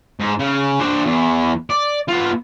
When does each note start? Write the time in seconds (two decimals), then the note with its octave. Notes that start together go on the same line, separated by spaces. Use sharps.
0.20 G#2
0.39 C#3
0.80 D4 C5
1.05 E2
1.70 D5
2.08 B3 F4